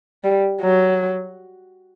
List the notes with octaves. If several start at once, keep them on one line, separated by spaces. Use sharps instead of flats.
G3
F#3